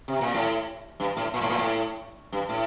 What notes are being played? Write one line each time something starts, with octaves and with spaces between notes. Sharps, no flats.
C3
A#2
A2
G2
A2
A#2
A2
A#2
A2
G2
A2